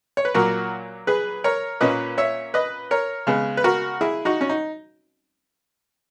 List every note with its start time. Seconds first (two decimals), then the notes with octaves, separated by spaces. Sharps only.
0.17 C#5
0.25 B4
0.34 A#2 F#3 A#3 F#4 A#4
1.07 G#4 B4
1.44 A#4 C#5
1.81 A#2 A#3 C#4 B4 D#5
2.18 C#5 E5
2.54 B4 D#5
2.91 A#4 C#5
3.27 C#3 G#3 B3
3.57 B4
3.64 F#4 A#4
4.01 E4 G#4
4.25 D#4 F#4
4.41 C#4
4.49 D#4